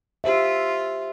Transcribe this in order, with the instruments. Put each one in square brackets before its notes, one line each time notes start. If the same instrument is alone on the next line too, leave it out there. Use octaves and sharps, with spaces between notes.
[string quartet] F4 [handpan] G4 C5 E5